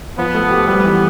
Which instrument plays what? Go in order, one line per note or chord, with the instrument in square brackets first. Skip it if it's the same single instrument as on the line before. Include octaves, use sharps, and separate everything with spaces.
[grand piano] F3 [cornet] B3
[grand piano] A3
G4
[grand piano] G3 [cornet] B3
[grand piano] E3